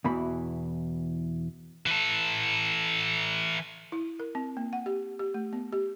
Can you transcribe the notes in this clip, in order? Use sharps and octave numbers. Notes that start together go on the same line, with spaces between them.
E2 B2 E3 B5
E3 A4
E4
A#4
C4
A#3
F#5
G4
G4
A3
B3
G4